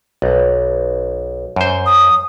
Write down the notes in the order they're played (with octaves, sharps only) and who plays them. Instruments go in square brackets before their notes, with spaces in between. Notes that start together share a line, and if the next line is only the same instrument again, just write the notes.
[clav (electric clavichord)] B1
F#2 C5
[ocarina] D#6